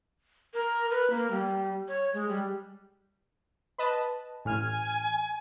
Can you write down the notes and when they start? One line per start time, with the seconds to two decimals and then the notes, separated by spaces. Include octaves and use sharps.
0.54 A#4
0.90 B4
1.10 A#3
1.31 G3
1.88 C#5
2.14 G#3
2.29 G3
3.78 B4 D#5 A5
4.45 A1 G#5 F6